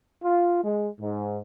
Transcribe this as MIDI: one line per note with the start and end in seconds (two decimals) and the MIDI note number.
0.23 0.63 65
0.64 0.88 56
1.00 1.39 44